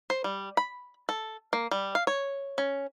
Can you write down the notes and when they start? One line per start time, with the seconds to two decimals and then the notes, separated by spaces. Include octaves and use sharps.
0.10 C5
0.24 G3
0.57 B5
1.09 A4
1.53 A#3
1.71 G3
1.95 F5
2.07 C#5
2.58 C#4